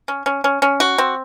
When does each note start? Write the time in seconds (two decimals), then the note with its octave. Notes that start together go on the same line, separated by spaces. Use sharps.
0.08 C#4
0.26 C#4
0.44 C#4
0.62 C#4
0.80 F#4
0.98 C4